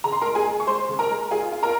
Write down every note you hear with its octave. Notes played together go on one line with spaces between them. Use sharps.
C#3 A#5
C6
A#4 A#5
G#3
G#4 G#5
G#3
C#6
G#3 C5 C6
C#3
A#4 A#5
G#3
F4 G#4 G#5
F4
A#4 A#5